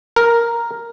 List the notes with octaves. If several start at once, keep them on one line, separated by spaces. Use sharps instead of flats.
A#4